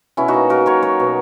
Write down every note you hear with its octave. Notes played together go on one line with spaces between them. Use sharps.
B2 C#4 E4
D#4 F#4
A#3
A#3 F#4 A#4
F#3 A#4 C#5
F#3 A#4 C#5
B2